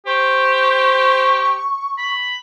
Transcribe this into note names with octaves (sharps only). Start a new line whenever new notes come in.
G4 C5 C#6
B5